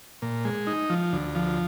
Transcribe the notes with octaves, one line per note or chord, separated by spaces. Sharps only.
A#2
G#3
D#4
F3
D2
F3